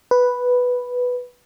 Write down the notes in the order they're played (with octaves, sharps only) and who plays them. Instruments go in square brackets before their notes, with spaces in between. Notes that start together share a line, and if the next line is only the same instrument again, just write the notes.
[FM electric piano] B4